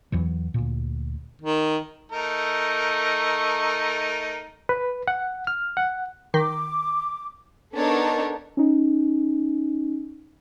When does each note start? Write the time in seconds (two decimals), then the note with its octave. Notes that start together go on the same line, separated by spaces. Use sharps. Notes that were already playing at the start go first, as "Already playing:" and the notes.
0.12 E2 E3 F#3
0.54 D2 A#2
1.42 D#3
2.12 A3 D#4 A#4
4.69 B4
5.08 F#5
5.47 F6
5.77 F#5
6.34 D#3 D6
7.74 B3 D4 D#4 A4 A#4 C#5
8.57 C#4 D#4